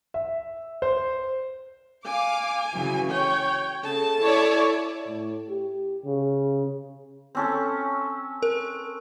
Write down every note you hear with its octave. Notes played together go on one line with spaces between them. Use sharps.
E5
C5
F5 G#5 D6
C#3 E3 F#3
C#5 G5
C#3 A4 A5
E4 C#5 D5
A2
G4
C#3
C4 C#4 A4
A#4